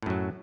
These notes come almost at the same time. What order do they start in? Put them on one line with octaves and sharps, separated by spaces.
A2 F#2 F#3